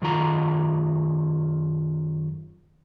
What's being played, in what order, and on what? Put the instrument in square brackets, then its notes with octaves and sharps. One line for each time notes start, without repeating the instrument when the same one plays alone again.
[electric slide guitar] F#2 D#3 F4 A#5